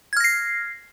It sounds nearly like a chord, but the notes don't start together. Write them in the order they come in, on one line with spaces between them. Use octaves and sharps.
G#6 F6 A#6 C7